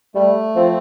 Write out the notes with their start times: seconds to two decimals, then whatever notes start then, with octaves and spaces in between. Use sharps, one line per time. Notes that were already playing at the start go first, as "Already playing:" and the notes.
0.15 G3 A3
0.56 F3 C4